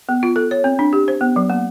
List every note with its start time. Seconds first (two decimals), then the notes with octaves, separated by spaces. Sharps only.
0.09 B3
0.23 F4
0.36 A4
0.51 C#5
0.64 C4
0.79 D4
0.93 G4
1.08 C5
1.21 B3
1.36 F#3
1.50 A#3